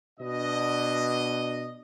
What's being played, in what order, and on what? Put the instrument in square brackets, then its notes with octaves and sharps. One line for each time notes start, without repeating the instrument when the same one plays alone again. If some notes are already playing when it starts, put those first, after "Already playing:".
[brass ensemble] B2 D4 D#5